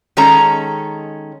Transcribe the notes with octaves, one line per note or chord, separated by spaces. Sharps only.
D#3 G#3 C#4 A4 A#5